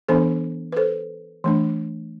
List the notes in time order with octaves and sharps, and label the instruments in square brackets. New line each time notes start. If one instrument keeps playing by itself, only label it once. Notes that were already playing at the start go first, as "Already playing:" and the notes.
[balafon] E3 B3 D4 A4 C5
B4
A4 C5
E3 A3 D4